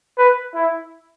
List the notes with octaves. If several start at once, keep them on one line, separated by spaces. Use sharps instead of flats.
B4
E4